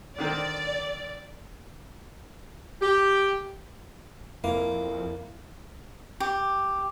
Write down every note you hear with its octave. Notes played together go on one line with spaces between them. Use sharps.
D3 D#3 C4 D5
G4
F2 A#3 E4
G4